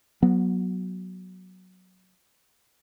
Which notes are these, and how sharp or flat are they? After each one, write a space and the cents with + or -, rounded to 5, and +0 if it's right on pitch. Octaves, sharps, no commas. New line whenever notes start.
F#3 +0 B3 -25